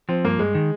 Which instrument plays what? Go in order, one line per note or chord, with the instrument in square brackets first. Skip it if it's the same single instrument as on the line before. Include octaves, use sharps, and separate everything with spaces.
[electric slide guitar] F3 [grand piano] C4
[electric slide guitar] G2 [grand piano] A#3
[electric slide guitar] G2 [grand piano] G#3
[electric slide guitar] D#3